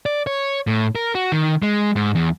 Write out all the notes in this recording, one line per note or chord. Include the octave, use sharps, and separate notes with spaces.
D5
C#5
A2
A#4
F#4
D#3
G#3
G#2
E2